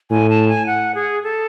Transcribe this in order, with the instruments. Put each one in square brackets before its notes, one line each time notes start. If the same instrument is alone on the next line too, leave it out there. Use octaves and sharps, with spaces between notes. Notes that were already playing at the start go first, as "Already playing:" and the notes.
[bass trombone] A2 [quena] G#5
[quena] A5
G#5
F#5
G#4
A4